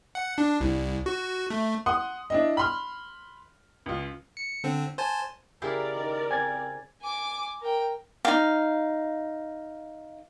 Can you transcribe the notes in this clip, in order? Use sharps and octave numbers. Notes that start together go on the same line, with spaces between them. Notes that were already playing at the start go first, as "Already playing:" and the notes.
F#5
D4
C2
F#4
A3
F#5 C6 D#6
D4 E4 D#5
B5 C6 F6
C#2 F4
C#7
D3 C4
C5 G#5 A5
C#3 E4 G4 A#4 D5
D#3
C4 G#5 G#6 A6
G#5 D6
A#4 G5
D#4 F5